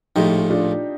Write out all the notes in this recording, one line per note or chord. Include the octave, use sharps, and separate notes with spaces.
A#1 A2 F3 D#4 G4
D4 F4